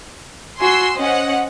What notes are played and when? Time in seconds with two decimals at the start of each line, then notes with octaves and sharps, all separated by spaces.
0.60 F#4 G#5 C6 E6
0.97 C#4 C5 D#5 F#5